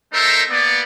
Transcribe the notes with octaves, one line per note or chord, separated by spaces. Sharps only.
A3 D#4 A4 A#4 C5 E5
A#3 B3 D5